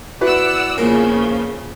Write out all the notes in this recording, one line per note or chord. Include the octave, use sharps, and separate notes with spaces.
E4 F#4 B4 D5 F#5 E6
E2 C#3 F3 A#3